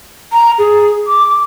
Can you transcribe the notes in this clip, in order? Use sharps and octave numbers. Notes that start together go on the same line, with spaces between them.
A#5
G#4
D6